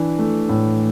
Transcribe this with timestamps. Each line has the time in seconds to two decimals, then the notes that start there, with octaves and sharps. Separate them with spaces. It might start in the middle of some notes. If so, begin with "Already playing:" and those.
Already playing: E3 D4
0.19 A3
0.49 A2